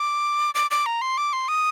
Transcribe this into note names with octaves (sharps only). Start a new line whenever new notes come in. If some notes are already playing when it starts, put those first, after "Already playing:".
Already playing: D6
D6
D6
A#5
C6
D6
C6
D#6